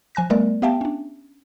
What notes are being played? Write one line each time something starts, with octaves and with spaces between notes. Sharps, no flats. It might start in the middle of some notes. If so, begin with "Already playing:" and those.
F3 G#5 F#6 A#6
G3 A3 B3 A#4 D5
B3 G4 E5 F5 G5 A5
C#4 D4